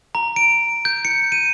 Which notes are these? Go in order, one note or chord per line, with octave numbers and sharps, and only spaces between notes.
A#5
D7
G6
C#7
D#7